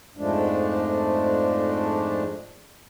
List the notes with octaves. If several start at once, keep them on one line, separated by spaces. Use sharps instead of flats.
F2 G#2 F3 G#3 A3 D4